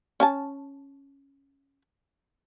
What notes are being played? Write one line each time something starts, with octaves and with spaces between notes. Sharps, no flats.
C#4 G#5 A5